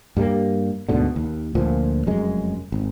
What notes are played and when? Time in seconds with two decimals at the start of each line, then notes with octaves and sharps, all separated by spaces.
0.17 G2 G3 A3 A#3
0.89 D2 G#2 B2 D3
1.16 D#2
1.55 D2 A#2 F3
2.07 F1 F#2 G#3
2.72 G#1